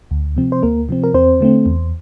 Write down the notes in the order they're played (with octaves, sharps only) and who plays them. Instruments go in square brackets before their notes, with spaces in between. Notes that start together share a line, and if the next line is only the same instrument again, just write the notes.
[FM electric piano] D2
C3 F3 C4
C5
D2 A#3 A#4
C3 F3 C4
A#4
E2 C4 C5
D3 A3 C4
E2